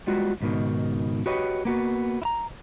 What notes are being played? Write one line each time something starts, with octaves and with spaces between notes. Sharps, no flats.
G3 G#3 B3 F4 F#4
C#2 G#2 B2 D#3
F#4 G4 B4 C#5 D#5
A#3 B3 F#4
E4 A#5